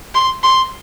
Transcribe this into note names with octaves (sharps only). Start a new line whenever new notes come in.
C6
C6